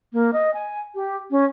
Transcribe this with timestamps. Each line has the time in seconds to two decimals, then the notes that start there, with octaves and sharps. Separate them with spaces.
0.13 A#3
0.33 D#5
0.54 G#5
0.95 G4
1.31 C#4